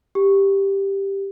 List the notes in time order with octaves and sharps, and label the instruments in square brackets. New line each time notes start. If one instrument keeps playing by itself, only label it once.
[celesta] G4